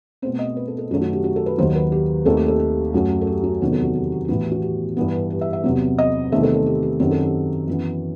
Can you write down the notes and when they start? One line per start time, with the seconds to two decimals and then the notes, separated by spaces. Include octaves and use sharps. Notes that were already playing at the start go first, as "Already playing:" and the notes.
0.22 B2 A3 C4 C5
0.39 D#5
0.57 B4
0.68 A4
0.78 A4
0.91 F#2 D#3 F#3 A3 F#4
1.02 F#4
1.13 G4
1.24 F#4
1.36 A4
1.46 B4
1.58 D#2 D#3 F#3 C5
1.75 B4
1.92 G4
2.25 D#2 D#3 A3 C4 A4
2.37 G4
2.48 A4
2.59 G4
2.94 F#2 F#3 A3
3.21 A4
3.27 G4
3.44 F#4
3.61 E2 C3 D#3 F#3 B3
3.72 A4
3.84 F#4
3.95 G4
4.12 G4
4.25 G4
4.28 A2 E3 B3 F#4
4.41 G4
4.52 F#4
4.62 G4
4.97 G2 E3 B3
5.30 G4
5.41 E5
5.53 E5
5.64 E2 C3 F#3
5.99 D#5
6.32 E2 C3 D#3 A3 C4 E5
6.43 A4
6.54 A4
6.66 G4
6.83 G4
7.00 F#2 D#3 F#3 C4 G4
7.11 A4
7.23 G4
7.67 F#2 E3 B3